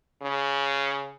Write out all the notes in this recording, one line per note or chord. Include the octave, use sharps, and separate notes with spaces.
C#3